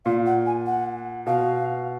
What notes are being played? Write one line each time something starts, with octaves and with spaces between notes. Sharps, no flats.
A#2 F5
F#5
G#5
F#5
B2 F5